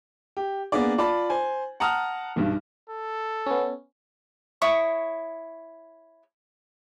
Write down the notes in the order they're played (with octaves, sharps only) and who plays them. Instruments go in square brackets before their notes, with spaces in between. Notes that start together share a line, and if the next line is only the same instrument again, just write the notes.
[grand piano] G4
A#3 B3 D4 G#4 D5
F4 D5 A5 B5
C5 G#5
F#5 A5 A#5 D#6 F6
B1 G2
[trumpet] A4
[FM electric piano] B3 C#4
[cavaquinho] E4 C#5 C#6 D#6